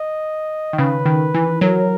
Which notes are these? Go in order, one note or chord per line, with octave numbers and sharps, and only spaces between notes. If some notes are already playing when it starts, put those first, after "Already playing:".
Already playing: D#5
D#3
C#3 B4
D#3
E3
F#3 A#4